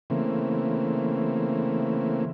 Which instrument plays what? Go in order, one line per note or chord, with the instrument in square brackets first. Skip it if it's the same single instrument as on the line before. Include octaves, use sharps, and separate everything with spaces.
[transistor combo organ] C#3 E3 A3 A#3 C4